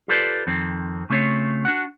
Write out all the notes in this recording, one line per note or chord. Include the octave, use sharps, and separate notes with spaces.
F4 G4 A4 B4 C5 D5
F2 D#3 C4
C#3 A3 C4 F4 C#5
D4 F#4 F#5